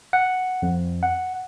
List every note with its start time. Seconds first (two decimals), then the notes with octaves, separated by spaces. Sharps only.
0.13 F#5
0.62 F2
1.03 F#5